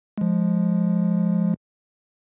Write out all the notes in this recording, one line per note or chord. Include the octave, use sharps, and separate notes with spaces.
F3 G#3